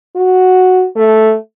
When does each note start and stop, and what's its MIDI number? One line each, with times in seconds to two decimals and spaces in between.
0.16 0.85 66
0.96 1.35 57